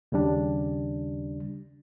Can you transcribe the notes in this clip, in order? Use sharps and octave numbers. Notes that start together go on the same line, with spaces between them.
D#2 C#3 G3 D4